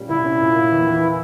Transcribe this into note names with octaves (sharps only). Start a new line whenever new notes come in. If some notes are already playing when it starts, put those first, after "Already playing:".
Already playing: A#2 G3 C#4
C2 E4
C#4
A#2
A#3
E2
E3